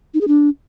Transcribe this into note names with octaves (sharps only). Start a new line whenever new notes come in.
D#4
G#4
D4